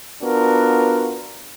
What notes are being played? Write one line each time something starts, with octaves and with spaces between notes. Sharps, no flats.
B3 D4 F4 F#4 A#4